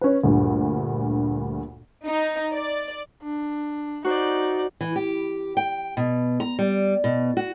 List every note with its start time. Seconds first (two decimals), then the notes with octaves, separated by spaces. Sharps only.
0.01 C#4 B4
0.23 D2 G2 A#2
2.06 D#4
2.53 D5
3.23 D4
4.04 D#4 F#4 C5 D5
4.81 E3
4.96 G4
5.57 G5
5.97 B2
6.40 A#5
6.59 G3
7.04 B2
7.37 F#4